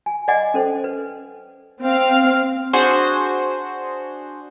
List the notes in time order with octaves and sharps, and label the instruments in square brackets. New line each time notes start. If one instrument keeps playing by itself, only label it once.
[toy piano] G#5
D5 D#5 F#5 G#5 D6
C#4 A4 C5
B4
[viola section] C4 F5
[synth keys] D4 F#4 G#4 C5